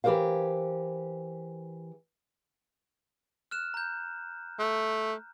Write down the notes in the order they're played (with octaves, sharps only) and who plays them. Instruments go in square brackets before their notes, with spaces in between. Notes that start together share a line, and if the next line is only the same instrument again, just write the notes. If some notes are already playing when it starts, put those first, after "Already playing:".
[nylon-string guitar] E3 G4 A4 A#4 C5 F5
[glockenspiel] F6 F#6 E7
A#5 G6
[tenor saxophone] A3